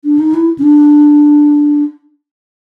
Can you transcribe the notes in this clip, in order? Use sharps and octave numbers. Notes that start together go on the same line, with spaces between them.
D4
D#4
E4
C#4
D4